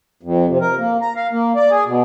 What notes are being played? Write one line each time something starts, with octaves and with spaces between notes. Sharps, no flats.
F2
C3
A#4
A#3
A#5
F5
A#3
D5
G#4
B2